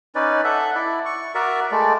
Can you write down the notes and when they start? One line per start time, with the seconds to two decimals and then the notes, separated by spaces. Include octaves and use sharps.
0.15 C#4 D#4 B4 D5
0.44 A4 E5 F#5
0.75 E4 D5
1.05 C#6
1.35 F#4 A#4 D5 E5
1.72 G#3 A3 D5